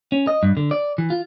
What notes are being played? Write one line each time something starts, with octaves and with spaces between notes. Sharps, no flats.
C#4
D#5
G2
D3
D5
E3
F4